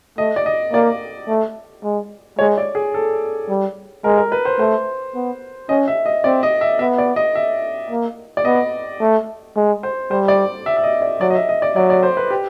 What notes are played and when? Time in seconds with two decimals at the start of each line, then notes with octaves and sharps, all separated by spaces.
0.18 A3 D#5
0.36 D5
0.46 D#5
0.73 A#3 D5
1.28 A3
1.83 G#3
2.39 G#3 C#5
2.58 D5
2.75 G#4
2.94 A4
3.49 G3
4.04 G#3 A#4
4.17 A#4
4.32 B4
4.45 C5
4.59 A3 C5
5.14 B3
5.69 C#4 D#5
5.88 E5
6.06 D#5
6.24 C4 D5
6.43 D#5
6.61 E5
6.79 B3 E5
6.98 D5
7.16 D#5
7.35 E5
7.90 A#3
8.37 D5
8.45 B3 D#5
9.00 A3
9.56 G#3
9.83 C5
10.11 G3 C5
10.28 D5
10.66 E5
10.77 E5
10.83 D#5
11.02 D5
11.20 F#3 D5
11.30 D#5
11.35 E5
11.49 D#5
11.62 D5
11.76 F#3 D5
11.90 D5
12.03 C5
12.17 B4
12.31 G4